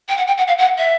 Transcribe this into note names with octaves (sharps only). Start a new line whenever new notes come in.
G5
F#5
G5
F#5
F5
F#5
E5